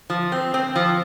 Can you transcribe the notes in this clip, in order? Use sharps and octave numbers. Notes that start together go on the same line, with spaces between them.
F3
C4
C4
F3